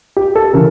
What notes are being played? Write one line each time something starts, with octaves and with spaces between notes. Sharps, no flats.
G4
A4
C#3 E3 A#4